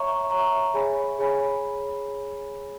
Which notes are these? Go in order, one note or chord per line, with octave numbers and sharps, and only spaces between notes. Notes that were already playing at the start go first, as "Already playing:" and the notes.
Already playing: C#5 E5 A#5 C#6
C#5 E5 A#5 C#6
G#4 C#5 G#5 B5
G#4 C#5 G#5 B5